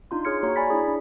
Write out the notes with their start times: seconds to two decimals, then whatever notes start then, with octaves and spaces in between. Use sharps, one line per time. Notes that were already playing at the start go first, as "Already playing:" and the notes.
0.11 D4 D#4 F4 C6
0.25 G#4 C#5 F6 G#6 C#7
0.43 A#3 F#4 C#5 A#5
0.56 D5 G#5 B5 A6 B6
0.70 D4 E4 G#4
0.85 D4 B6